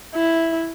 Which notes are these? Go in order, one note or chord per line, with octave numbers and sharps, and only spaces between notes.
E4